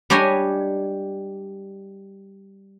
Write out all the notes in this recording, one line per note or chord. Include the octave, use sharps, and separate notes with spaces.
G3 D4 G4 C#5 D#5 G#5